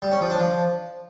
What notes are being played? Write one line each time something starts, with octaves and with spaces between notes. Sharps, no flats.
G3
C#4
F3
D4
F3